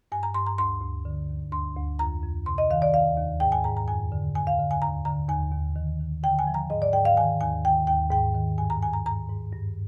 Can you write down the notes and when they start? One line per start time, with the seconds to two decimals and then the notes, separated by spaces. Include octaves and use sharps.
0.12 G2 G#5
0.23 A#5
0.34 G2 C6
0.47 A#5
0.58 D2 C6
0.81 D2
1.05 D3
1.29 D#2
1.52 D2 C6
1.77 D2
1.99 F2 A#5
2.23 F2
2.46 C3 C6
2.58 D#5
2.70 D#3 F5
2.82 D5
2.94 D#2 F5
3.17 D#2
3.40 G#2 G5
3.52 G#5
3.64 G#2 A#5
3.77 A#5
3.88 F2 G#5
4.12 D3
4.35 D2 G#5
4.47 F5
4.59 D3
4.71 G#5
4.82 D#2 A#5
5.05 D3 A#5
5.29 D#2 G#5
5.52 D#2
5.76 D#3
6.00 D#3
6.23 D3 G5
6.39 G#5
6.47 F3
6.54 A#5
6.70 G#2 D#5
6.82 D5
6.93 G#2 G5
7.05 F5
7.17 D#3 G#5
7.41 D#2 G#5
7.65 D#3 G5
7.87 D#2 G5
8.11 G#2 G5
8.34 D#3
8.58 G2 G#5
8.70 A#5
8.82 G2 G#5
8.93 A#5
9.06 G#2 A#5
9.29 G#2
9.52 G2